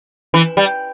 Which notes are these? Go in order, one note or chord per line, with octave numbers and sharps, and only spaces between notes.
E3
G3